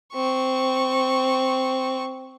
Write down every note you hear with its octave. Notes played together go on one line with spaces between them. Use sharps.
C4 C#6